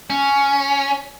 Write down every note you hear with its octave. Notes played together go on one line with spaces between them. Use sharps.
C#4